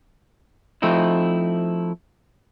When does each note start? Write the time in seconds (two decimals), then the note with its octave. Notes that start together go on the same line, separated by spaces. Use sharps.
0.82 F3 A3 C4 D#4 E4